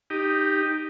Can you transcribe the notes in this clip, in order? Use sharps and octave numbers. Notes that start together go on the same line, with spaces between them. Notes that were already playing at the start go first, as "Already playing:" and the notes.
D#4 G4